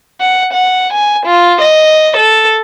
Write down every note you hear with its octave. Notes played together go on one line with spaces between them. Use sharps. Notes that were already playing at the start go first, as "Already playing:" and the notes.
F#5
F#5
G#5
F4
D#5
A4